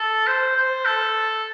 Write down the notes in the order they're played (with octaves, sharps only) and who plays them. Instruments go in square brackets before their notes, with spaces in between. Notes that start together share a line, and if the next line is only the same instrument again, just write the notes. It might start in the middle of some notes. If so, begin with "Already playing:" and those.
Already playing: [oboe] A4
C5
C5
A4